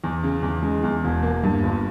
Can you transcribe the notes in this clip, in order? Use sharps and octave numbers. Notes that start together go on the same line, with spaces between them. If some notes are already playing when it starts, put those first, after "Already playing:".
E2
C#3
E2
G#3
E2
E1
A#3
G2
G1